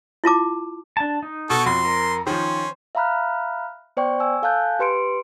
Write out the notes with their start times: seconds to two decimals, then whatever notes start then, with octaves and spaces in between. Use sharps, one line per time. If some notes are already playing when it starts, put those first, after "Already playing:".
0.24 E4 F4 A5 D6
0.97 D4 A5
1.23 D#4
1.50 B2 F#4 A4 C#6
1.66 F2 F#4 C6
1.85 A#4
2.27 D#3 F3 C#4 C5
2.95 E5 F5 A#5 B5 F6 F#6
3.97 B3 C5 D5 G5 C#6
4.20 G#5 E6
4.42 A4 F5 G#5 A5 F#6 G6
4.79 G4 B4 C6 C#7 D7